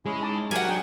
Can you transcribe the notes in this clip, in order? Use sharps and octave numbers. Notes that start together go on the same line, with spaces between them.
G#3 C#4 E4 G#4
D#4 A5 D6
F#3 G4 A#4 F#5 G#5
D4 G#4 G5